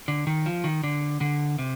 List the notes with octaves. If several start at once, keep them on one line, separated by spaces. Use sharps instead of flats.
D3
D#3
F3
D#3
D3
D3
C3